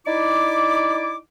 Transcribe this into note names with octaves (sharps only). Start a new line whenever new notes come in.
D#4 E4 D5 D6